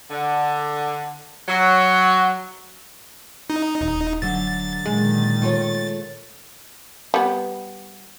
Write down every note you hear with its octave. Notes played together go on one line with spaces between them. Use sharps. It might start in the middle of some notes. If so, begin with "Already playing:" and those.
D3
F#3
D#4
D#1
D3 F#3 A3 A6
A#2 D#3 G#3
A3 F4 C#5
G3 B3